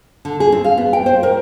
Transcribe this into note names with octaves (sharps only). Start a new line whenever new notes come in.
D3
G#4
C4
F5
B3
G5
C5
A#4